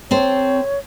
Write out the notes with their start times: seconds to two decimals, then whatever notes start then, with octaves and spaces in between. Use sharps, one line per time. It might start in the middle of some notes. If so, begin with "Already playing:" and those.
0.11 C4 A4 C5 C#5